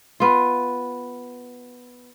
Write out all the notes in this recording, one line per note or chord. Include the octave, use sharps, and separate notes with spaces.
B3 F4